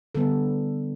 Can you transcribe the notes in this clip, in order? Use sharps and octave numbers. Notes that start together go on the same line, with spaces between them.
D3 G3 B3 A4